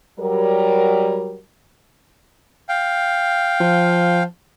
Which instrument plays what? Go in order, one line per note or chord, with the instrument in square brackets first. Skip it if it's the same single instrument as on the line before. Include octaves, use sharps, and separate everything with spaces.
[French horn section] F#3 G3 A#4
[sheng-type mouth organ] F5 G5
[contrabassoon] F3